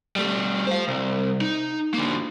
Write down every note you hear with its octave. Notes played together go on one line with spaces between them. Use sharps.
G3 A3
C5 F5
C2
D#4
D3 A#3